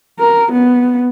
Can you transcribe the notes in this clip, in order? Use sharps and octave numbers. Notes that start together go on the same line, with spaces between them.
A#4
B3